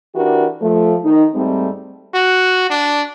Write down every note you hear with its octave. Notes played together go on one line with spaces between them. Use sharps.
E3 D4 F#4 G4 A#4
F3 A3
D#3 D#4
G#2 G3 A3 C4
F#4
D4